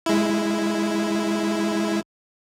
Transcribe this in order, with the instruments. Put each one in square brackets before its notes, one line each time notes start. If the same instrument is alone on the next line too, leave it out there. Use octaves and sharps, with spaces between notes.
[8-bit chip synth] G#3 E4